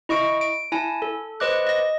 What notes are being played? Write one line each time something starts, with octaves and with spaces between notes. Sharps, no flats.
E4 D#5 C#6 D7
D7
E4 G#5 A5
A4
B4 C5 D#5 D6 F#6
D#5 A#6